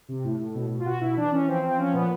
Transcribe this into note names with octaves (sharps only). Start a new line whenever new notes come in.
C3
A2
A2
B2
B2
F4
B2 F#4
B2 E4
E3 D4
E3 C#4
F3 C4
F3 C4
F3 C#4
A#2 B3